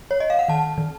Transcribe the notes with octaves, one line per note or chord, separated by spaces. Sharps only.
C#5
D#5
F5
F#5
D#3 A5
D#3